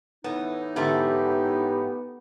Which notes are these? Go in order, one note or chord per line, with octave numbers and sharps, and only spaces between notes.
A2 E3 B3 D#4
G#2 D3 A3 B3 G4